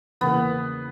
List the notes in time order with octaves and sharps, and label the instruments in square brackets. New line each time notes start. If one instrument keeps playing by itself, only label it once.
[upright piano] E2 C#3 E3 A#3 [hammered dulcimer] B3